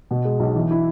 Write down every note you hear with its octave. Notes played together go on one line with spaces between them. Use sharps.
B2
G#3
B1
E3
E4